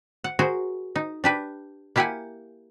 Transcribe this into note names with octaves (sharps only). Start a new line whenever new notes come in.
F#5
F#4 G#4 A#4 C5
D#4
D4 G4 B4
A#3 E4 G4 F5 F#5 G#5